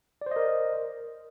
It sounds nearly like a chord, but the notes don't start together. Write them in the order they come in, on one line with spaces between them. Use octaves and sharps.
D5 C5 D#5 A#4